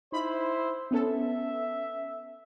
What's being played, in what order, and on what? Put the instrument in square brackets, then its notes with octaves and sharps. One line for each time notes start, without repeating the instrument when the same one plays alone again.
[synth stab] D#4 B5 [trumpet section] E4 C5
[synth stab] B3 C#4 A4 [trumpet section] E5